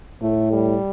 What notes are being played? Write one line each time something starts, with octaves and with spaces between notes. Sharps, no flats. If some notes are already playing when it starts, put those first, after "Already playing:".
A2 A3
G3